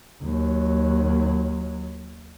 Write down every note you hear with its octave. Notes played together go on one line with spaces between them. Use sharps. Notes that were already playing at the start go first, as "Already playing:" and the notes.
D#2 F#3